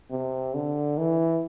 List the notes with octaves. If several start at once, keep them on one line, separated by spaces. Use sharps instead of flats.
C3
D3
E3